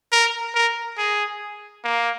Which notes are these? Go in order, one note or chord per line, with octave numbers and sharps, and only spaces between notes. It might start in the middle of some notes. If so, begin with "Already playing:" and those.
A#4
A#4
G#4
A#3